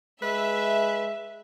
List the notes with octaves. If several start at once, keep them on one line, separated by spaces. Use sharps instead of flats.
G#3 B4 E5